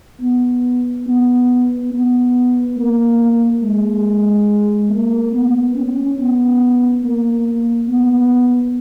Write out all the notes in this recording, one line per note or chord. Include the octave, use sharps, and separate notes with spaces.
B3
B3
B3
A#3
G#3
A#3
B3
C#4
B3
A#3
B3